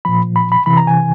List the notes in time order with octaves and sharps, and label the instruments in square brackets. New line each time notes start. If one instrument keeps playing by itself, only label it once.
[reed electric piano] A#2 F3 B5
B5
B5
C3 E3 B5
A#5
G#5